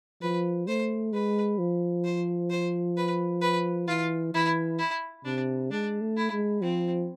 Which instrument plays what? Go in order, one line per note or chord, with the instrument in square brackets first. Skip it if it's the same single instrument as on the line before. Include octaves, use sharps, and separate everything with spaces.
[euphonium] F3 [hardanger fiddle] B4
[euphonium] A3 [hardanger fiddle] C5
[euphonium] G#3 [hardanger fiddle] B4
[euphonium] F3
[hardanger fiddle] C5
C5
B4
B4
[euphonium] E3 [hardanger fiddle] F4
[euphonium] E3 [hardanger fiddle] E4
[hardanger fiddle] E4
[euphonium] C3 [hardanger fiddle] D4
[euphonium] G#3 [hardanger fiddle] D4
[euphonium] A3
[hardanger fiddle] E4
[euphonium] G#3
[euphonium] F3 [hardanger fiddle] C4